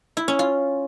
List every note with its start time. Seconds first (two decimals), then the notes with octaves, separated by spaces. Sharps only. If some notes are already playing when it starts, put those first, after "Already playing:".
0.17 E4
0.28 C#4
0.39 F4